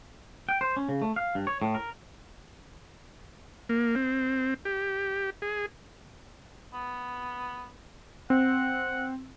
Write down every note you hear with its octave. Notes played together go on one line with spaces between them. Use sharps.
G5
C5
C#4
C#3
A3
F5
G2
C#5
A2
A#4
A#3
C4
G4
G#4
B3
C4 F#5